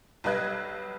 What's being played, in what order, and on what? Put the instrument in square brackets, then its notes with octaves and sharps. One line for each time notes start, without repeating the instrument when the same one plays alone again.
[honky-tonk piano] B1 G3 B4 D#5 F#6 G#6